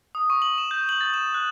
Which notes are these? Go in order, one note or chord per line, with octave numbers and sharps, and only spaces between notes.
D#6
C#6
F#7
E7
G6
F#7
A6
E7
F#6